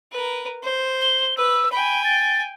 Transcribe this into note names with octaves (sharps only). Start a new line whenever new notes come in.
A#4 B4
C5
G7
B4 E6
G5 G#5 B5
A6